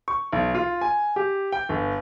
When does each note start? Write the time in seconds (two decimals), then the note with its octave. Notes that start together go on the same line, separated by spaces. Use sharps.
0.08 C#6
0.33 B1
0.55 F4
0.81 G#5
1.16 G4
1.52 G5
1.69 G1